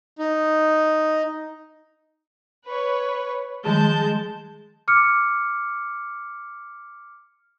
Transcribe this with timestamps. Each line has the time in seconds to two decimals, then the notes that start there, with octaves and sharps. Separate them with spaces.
0.19 D#4
2.66 B4 C#5
3.66 D#3 F3 G3 G#3 A5 G6
4.88 D6 F6 C#7